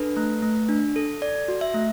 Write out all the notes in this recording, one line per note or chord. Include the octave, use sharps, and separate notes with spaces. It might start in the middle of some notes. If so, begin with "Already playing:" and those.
Already playing: D4 A4 B4
A3
A3
D4
A4
A4 D5
F#4
E5
A3